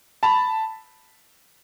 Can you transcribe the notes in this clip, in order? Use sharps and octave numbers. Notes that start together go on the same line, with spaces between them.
A5 B5